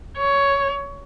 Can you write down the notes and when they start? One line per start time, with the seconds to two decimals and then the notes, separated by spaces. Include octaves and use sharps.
0.18 C#5